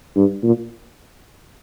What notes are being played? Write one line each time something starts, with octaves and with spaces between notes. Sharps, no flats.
G2
A#2